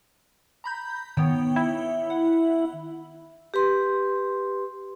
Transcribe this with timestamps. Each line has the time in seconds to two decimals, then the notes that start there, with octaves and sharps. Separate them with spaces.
0.64 A#5 B5 G6
1.17 D#3 B3 C#5 G5
1.56 E4
2.10 F#5
3.54 G4 B4 C6